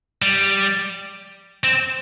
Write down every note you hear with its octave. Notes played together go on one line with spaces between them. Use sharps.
G3
C4